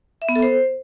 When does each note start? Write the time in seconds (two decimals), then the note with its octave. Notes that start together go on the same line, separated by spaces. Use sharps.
0.22 E5
0.29 B3
0.36 A4
0.43 C5